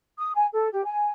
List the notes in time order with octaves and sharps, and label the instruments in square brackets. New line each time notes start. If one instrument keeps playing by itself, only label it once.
[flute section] D#6
G#5
A4
G4
G#5